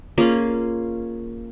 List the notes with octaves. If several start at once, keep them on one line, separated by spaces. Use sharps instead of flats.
A#3 C#4 F4 G#4